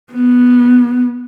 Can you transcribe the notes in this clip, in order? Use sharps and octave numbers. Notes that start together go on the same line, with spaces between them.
B3